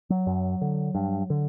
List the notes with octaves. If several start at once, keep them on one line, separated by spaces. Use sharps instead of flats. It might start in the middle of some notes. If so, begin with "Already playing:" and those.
F#3
F#2
D3
G2
D3